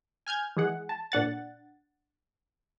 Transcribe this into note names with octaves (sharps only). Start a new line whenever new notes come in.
G#5 F6 G6 G#6
E3 G#3 G#4 F#5
A5
A#2 D4 F#5 A6